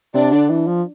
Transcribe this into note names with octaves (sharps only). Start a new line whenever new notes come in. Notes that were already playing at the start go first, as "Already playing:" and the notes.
C3 D4 D5
D3
E3
F3